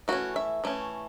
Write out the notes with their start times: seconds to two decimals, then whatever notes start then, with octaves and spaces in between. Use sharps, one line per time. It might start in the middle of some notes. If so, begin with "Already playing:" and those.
0.08 E3 A3 C#4 F#4
0.36 E5
0.64 E3 A3 C#4